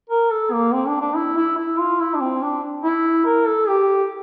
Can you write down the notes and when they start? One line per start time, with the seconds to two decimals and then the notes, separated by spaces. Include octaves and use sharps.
0.10 A#4
0.31 A4
0.52 A#3
0.73 C4
0.88 D4
1.02 D4
1.16 E4
1.37 E4
1.58 E4
1.79 F4
2.00 E4
2.14 D4
2.20 C4
2.42 D4
2.84 E4
3.26 A#4
3.47 A4
3.69 G4